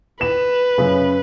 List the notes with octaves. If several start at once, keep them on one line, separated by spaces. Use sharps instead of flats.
B4 E7
F#2 C#3